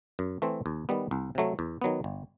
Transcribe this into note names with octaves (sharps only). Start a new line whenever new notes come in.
F#2
E3 A3 C4
D#2
D#3 G3 B3
C2
C3 F#3 A3
E2
D#3 F#3 B3
G1